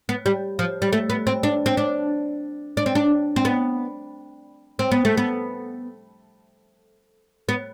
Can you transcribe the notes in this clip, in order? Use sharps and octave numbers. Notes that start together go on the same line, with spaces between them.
B3
G3
F3
G3
A3
B3
C4
D4
C4
D4
D4
C4
D4
C4
B3
C4
B3
A3
B3
B3